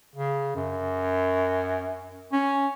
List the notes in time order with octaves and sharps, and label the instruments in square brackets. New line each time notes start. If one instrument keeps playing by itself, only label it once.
[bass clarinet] C#3
F#2
C#4